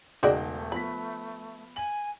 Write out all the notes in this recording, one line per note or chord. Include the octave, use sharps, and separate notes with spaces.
E1 C#3 A3 D#4 F#4 D5 G5 A#6
F3 B3 B5 B6
G#5 F#7